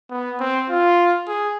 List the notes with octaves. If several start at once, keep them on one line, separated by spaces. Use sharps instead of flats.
B3
C4
F4
G#4